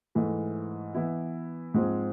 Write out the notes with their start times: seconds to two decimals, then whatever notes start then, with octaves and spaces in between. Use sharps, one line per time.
0.15 G#2 E3 A3
0.94 E3 B3 E4
1.74 G#2 F3 G#3 C4 G#4